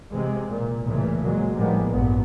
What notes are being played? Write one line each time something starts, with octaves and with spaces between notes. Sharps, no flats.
C3 E3 G#3
A#2
C#2 A#2 C#3 E3 A3
A#2 F#3 G#3
A2 F3 G3 G#3 A#3 B3
A1 G2 A#2 B3